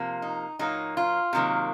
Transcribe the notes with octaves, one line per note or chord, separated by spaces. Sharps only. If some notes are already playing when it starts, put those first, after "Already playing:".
Already playing: C3 F3 A#3
D#4
A#2 F#3 A#3 D#4
F4
C3 D#3 F#3 A#3